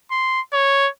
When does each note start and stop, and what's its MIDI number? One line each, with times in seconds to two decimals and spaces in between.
0.11 0.41 84
0.53 0.88 73